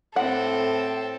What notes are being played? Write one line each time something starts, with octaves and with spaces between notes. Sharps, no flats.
A2 C4 A4 C5 F#5